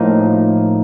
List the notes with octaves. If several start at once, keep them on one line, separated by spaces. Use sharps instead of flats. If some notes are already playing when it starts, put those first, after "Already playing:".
Already playing: A2 F3 A#3 D#4